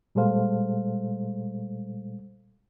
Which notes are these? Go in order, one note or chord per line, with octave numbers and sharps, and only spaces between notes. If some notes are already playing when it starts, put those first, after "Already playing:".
A#2 G3 G#3 A4 C5 F5